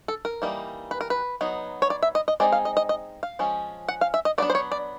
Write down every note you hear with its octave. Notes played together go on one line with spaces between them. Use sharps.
A4
A#4
E3 G3 A#3 D#4
B4
A#4
B4
F#3 B3 D#4
C#5
D5
E5
D#5
D#5
G#3 C4 D#4 D5
F5
D#5
D#5
D#5
F5
F3 G#3 C#4
F#5
F5
E5
D#5
F#3 B3 D4 D5
C5
C#5
D5